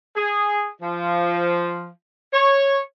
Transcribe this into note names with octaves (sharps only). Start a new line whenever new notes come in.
G#4
F3
C#5